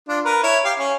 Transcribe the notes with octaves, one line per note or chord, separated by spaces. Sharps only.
D4 F4
A#4 B4
E4 C#5
G4 F5
C#4